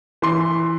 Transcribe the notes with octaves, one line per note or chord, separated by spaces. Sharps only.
E3 C6